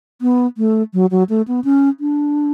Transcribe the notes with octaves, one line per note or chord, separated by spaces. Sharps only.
B3
A3
F#3
F#3
A3
B3
C#4
D4